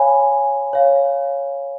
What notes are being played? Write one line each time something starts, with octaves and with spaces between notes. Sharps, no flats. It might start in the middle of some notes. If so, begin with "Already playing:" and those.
Already playing: C#5 F5 G#5 B5
C#5 F5